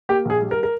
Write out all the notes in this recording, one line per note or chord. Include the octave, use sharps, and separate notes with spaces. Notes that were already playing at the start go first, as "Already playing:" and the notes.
A#3 G4
A#1 G#4
G3
A#4
A#4